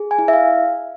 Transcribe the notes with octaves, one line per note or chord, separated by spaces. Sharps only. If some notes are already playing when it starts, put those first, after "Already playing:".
Already playing: G#4
G#5
E4
E5
F5